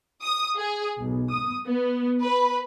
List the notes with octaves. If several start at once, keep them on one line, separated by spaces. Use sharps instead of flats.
D#6
G#4
B1
D#6
B3
B4